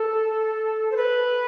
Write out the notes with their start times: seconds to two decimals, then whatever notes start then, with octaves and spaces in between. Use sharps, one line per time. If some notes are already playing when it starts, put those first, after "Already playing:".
Already playing: A4
0.91 C5
0.96 B4